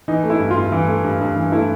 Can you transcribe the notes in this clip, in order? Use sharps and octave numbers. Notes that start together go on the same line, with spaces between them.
E3 D#4
A3
E4
G2
F4
G2
E3
A3
G2
G2
E3
A3 E4